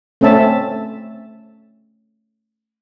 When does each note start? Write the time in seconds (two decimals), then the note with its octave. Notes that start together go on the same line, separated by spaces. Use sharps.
0.21 A3 C4 C#4 E5 A5